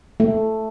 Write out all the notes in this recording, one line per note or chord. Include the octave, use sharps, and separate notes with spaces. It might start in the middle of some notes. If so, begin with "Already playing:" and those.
A3